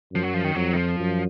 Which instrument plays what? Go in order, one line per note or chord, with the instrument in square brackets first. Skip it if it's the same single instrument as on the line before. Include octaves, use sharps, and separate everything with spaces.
[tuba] F#2 [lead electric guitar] F3
[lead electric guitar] F#3
F3
D#3
[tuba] F2 [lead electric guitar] F#3
[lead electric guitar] D#3
F3
[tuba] F#2